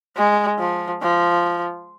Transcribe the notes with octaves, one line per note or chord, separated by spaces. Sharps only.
G#3
F3
F3